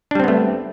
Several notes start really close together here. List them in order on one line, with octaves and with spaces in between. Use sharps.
D4 G3 C4 B3 A3